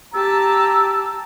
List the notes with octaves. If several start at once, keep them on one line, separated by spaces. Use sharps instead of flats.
G4 A5 A#5 E6